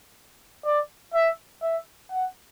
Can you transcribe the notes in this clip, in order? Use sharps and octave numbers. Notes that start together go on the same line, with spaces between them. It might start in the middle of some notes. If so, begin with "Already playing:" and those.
D5
E5
E5
F#5